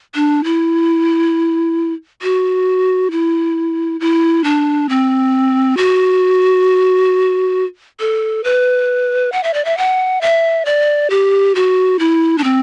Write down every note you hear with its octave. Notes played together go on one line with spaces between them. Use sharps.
D4
E4
F#4
E4
E4
D4
C4
F#4
A4
B4
F#5
E5
D5
E5
F#5
E5
D5
G4
F#4
E4
D4
C4